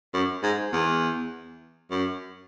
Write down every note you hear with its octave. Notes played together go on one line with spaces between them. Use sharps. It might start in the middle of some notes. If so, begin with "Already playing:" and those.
F#2
G#2
E2
F#2